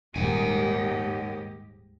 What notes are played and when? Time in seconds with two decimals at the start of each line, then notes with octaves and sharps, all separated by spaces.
0.16 D#1 D#2 G#2 G4 D#5 F#5 G#5